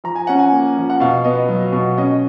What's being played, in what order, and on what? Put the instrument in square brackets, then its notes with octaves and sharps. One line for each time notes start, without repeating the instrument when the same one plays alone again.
[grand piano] F3 A#5
G#5
C#4 F#5
G#5
A#3
F3
F#5
B2 F5
B3 D#5
F#3
B2
C#4 D#5